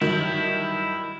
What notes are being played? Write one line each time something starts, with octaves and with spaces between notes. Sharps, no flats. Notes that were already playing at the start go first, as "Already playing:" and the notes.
G2 D#3 F#3 E4